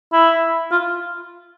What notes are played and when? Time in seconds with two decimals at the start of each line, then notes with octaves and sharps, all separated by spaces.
0.13 E4
0.71 F4